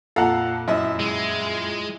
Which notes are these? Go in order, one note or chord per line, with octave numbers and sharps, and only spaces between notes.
F2 A#2 A4 F5 F#5 A5 A#5
F#2 E4 D#5 E5
G#3